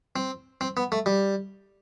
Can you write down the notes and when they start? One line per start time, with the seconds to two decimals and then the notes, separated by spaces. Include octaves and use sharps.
0.16 C4
0.61 C4
0.77 B3
0.92 A3
1.06 G3